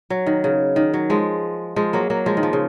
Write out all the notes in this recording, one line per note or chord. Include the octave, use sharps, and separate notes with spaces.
F#3
D#3
C#3
D#3
F#3
F3 G#3
F3 G#3
F#3 A#3
F#3 A#3
F3 G#3
D#3
F3
C#3